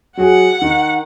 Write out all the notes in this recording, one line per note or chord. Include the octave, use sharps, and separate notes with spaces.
F#3 F#4 G#4 F#5
D#3